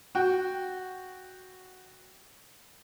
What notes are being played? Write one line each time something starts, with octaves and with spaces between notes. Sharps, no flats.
F#4 G5